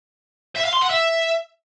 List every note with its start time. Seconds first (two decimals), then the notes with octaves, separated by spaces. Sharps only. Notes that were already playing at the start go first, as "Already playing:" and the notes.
0.56 E5
0.64 F5
0.73 C6
0.81 F#5
0.90 E5